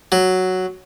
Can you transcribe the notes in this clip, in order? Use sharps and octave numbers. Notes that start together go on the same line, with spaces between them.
F#3